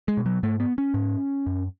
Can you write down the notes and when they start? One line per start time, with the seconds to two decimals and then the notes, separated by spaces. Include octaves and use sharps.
0.08 G#3
0.17 B2
0.26 F#3
0.43 G#2 A3
0.60 B3
0.78 C#4
0.94 G#2
1.47 F#2